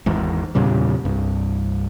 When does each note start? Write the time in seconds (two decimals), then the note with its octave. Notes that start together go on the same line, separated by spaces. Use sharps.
0.06 G#1 E2 G#2
0.55 E2 A#2 C#3 G3
1.05 C2 G2